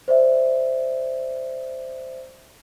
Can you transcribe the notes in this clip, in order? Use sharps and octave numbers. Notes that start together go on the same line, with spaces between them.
C5 D5 E5